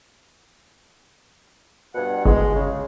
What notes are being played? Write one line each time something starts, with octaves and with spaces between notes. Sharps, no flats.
G2 B2 F#5
G1 G#3
C#3